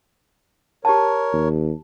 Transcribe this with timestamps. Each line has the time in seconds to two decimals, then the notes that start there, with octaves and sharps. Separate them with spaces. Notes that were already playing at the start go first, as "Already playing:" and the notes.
0.85 G4 A#4 C#5 A5
1.33 D#2